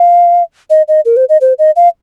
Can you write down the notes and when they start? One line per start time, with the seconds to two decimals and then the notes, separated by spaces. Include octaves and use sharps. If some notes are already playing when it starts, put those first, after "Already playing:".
Already playing: F5
0.70 D#5
0.88 D#5
1.05 A#4
1.17 C5
1.29 D#5
1.41 C5
1.59 D#5
1.76 F5